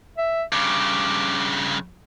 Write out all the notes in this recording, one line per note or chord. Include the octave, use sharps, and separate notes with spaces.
E5
G2 C#3 D6